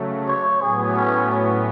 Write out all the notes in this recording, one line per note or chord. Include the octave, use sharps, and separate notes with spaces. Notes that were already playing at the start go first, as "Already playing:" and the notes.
Already playing: C#3 F#3 A3
C#5
A2 F#3 B3 G#4
C#4
C#4